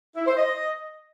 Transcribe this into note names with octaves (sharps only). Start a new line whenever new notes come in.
E4
C5
D#5